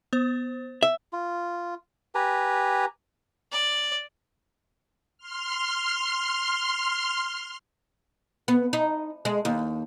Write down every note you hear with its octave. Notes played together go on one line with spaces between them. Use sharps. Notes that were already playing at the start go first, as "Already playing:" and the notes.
B3 C5
E5
F4
G4 B4 G#5 A#5
D5
C6 F6
B3
D#4
G#3
D#2